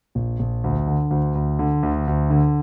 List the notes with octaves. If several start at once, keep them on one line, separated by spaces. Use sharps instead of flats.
A#1
A#1
D2
D3
D2
D2
D3
D2
D2
D3